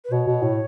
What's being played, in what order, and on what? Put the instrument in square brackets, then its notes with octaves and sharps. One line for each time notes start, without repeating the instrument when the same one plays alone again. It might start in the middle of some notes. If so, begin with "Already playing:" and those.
[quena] B4
[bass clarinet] B2 [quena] C#5
[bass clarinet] B2
A2